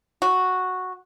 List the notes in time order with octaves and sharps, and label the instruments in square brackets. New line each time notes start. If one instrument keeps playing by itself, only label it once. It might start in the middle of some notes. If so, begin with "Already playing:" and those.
[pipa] F#4